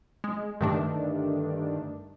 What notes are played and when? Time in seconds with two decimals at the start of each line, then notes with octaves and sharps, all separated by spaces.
0.24 G#3
0.61 G2 D3 D#3 A3 D4